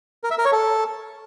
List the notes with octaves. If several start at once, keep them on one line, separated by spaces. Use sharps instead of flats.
A#4
E5
A#4
C#5
A4